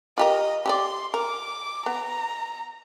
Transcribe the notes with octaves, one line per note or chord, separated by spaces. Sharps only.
F4 G4 A#4 D#5
G4 G#4 D5 C6
A#4 D6
B3 A#5